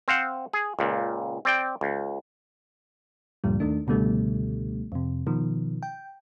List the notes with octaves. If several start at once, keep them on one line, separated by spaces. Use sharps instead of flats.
C4 C5 F5 F#5
G#4
C#2 A#2
C4 D5 G5
C#2
D2 G2 A#2 F3 G3
D#2 D#3 A3 D4
C#2 B2 D3 G3 A3
F2 C3
B2 D#3 F3
G5